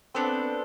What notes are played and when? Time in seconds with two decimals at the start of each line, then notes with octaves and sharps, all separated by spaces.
0.14 B3 C4 D4 A4